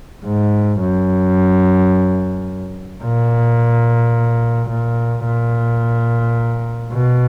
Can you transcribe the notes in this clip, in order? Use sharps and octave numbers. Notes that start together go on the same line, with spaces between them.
G#2
F#2
A#2
A#2
A#2
B2